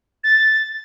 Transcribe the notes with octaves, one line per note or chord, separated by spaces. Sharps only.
A6